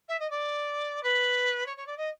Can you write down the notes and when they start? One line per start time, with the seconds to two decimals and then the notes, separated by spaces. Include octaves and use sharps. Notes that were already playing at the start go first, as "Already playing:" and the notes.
0.08 E5
0.19 D#5
0.30 D5
1.03 B4
1.66 C#5
1.76 C#5
1.86 D5
1.97 D#5